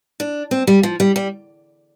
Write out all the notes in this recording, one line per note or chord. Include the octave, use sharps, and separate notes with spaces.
D4
C4
G3
F3
G3
G3